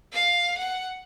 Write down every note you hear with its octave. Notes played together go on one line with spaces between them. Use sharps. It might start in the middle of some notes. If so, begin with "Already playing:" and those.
F5
F#5